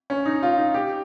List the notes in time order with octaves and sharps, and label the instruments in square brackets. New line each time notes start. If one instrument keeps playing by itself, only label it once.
[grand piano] C#4
D#4
F4
D#4
G4